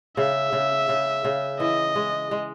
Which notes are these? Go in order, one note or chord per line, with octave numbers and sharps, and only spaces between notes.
C#3 E5
C#3
C#3
C#3
E3 D#5
G#3
G#3